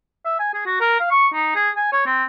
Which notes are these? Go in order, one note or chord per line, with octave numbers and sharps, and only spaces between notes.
E5
G#5
G#4
F#4
A#4
F5
C#6
D#4
G#4
G#5
C#5
C4